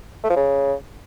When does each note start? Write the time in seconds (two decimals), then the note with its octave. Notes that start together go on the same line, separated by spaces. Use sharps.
0.24 A3
0.30 F3
0.36 C#3